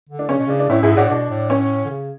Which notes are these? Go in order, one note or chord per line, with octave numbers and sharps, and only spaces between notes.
D3
D4
C#3 C#4
B2
C#3 D4
D4
A2 C#4 E4
G#2 E4 G#4
A2 D4 F#4
B2 D4
A2
C#4
D3
C#3